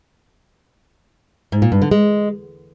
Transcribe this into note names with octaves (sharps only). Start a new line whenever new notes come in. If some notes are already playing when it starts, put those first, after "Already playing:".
G#2
A#2
G2
D3
G#3